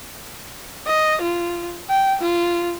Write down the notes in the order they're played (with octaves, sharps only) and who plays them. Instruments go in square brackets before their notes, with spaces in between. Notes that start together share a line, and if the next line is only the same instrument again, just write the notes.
[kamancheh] D#5
F4
G5
F4